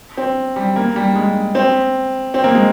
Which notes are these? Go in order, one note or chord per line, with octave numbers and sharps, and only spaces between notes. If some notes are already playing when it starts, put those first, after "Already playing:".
C4
G3
A#3
G3
G#3
C4
C4
A#3
G#3